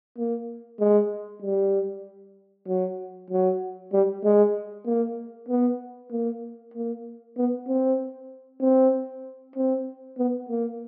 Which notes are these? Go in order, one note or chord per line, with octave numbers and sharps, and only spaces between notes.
A#3
G#3
G3
F#3
F#3
G3
G#3
A#3
B3
A#3
A#3
B3
C4
C4
C4
B3
A#3